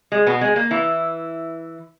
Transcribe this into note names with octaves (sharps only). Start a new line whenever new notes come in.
G#3
B2 B3
G#3
A#3
E3 E4